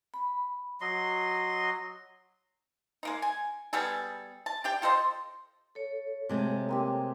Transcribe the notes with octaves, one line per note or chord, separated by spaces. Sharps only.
B5
F#3 D#5 C6
G#3 A#3 D#4
G#5
G3 B3 G#4 A4
A5
D4 G4 G5
F4 A4 C5 D#5
A4 C#5
C3 G#3 A3
A#3 C4 G4